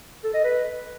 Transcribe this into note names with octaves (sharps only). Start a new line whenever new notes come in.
A4
D#5
B4